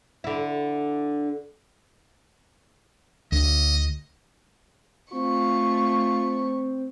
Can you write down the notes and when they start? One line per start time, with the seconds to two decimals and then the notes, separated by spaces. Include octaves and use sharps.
0.24 D3 E4
3.32 D2 D#5
5.12 A3 C4 F4 C#6